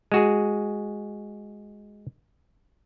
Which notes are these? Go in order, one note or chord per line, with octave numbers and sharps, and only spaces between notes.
G#3 F#4 G#4